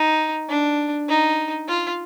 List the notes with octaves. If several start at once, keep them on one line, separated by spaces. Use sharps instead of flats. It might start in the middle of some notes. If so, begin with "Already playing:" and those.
Already playing: D#4
D4
D#4
F4